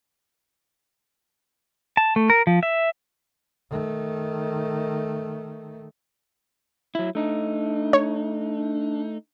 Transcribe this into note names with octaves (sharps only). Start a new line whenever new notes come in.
A5
A3
A#4
F3
E5
D#3 A3
F#3 E4
A3 D4 D#4
C#5